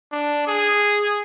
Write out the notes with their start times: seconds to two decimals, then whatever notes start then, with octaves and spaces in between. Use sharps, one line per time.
0.12 D4
0.47 G#4